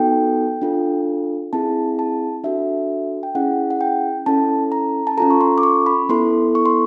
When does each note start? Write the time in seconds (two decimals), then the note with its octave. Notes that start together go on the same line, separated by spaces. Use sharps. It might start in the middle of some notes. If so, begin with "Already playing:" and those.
Already playing: B3 D#4 F#4 A4 G5
0.62 D4 F4 A4
1.53 C4 E4 G#4 A5
1.99 A5
2.44 D4 F#4 A4 E5
3.23 G5
3.35 C#4 E4 G#4 F#5
3.71 F#5
3.81 G5
4.26 C#4 E4 A4 A5
4.72 A#5
5.07 A5
5.17 C#4 F4 A4 A#5
5.30 C#6
5.41 C6
5.58 D6
5.63 C#6
5.86 B5
6.09 B3 E4 A4 C6
6.55 C#6
6.66 C6